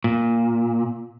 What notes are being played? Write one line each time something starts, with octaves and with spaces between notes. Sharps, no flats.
A#2